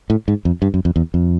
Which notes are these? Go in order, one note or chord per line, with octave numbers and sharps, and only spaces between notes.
A2
G#2
F2
G2
F#2
F2
E2
F2